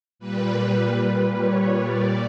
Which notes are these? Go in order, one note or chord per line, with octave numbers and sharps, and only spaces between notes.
A#2 G3 B4
B4
C#5
A#2 G3 D5